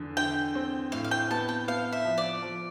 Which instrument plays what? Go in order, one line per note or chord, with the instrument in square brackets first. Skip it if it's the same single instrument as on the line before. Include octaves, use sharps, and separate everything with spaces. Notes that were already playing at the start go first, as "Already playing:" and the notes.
Already playing: [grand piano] E2 D3
[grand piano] D3 [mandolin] G5
[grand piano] C4
[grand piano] A2 [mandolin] F5
[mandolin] F5
G5
[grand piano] B3 [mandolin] A5
[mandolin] G5
[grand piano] B3 [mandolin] F5
[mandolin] E5
[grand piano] F3
[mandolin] D5
[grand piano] F3